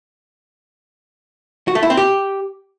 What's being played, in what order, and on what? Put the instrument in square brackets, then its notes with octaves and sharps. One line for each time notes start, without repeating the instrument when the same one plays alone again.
[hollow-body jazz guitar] F#4
A3
E4
C4
G4